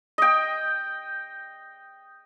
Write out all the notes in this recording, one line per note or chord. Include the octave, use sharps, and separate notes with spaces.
D#5 G5